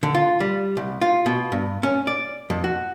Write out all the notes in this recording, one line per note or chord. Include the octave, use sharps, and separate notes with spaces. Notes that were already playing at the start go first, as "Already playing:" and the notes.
D3
F4
G3
C2
F4
B2
G2
C#4
D5
F2
F#4